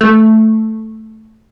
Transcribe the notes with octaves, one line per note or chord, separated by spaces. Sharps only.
A3